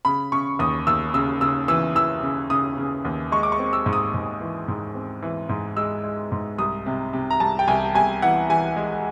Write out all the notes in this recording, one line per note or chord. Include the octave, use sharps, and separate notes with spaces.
C#3 B5
C#3 C#6
D#2 D#6
D#2 E6
C#3 E6
C#3 E6
E3 E6
E3 E6
C#3
C#3 D#6
C#3
D#2
G#3 C#6
D6
C#6
C4
E6
G#2
D#6
G#2
E3
G#2
C4
E3
G#2
G#3 E6
G#3
G#2
C2 D#6
C3
C3
A#5
C2 A5
G5
C2 G#5
C2 G#5
E3 F#5
E3 G#5
G#3